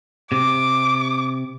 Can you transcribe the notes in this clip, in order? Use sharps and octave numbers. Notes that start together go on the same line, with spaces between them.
C3 D6